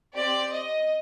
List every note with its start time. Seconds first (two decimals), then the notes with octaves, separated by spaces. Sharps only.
0.15 C4 G4 D5
0.52 D#5